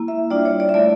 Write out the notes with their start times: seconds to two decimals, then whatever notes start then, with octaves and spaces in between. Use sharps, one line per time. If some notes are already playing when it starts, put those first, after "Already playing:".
Already playing: A#3 E4
0.08 E5
0.30 G3 D4 F4 D5
0.45 C#5
0.60 D5
0.69 E5
0.74 A3 E4 D5